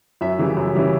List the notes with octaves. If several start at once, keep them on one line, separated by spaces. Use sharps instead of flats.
F#2 E5
C#3 E3 G3
F#2
C#3 E3 G3